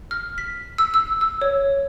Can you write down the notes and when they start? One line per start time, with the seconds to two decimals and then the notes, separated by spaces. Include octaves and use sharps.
0.11 F6
0.38 B6
0.78 E6
0.94 E6
1.21 E6
1.42 C#5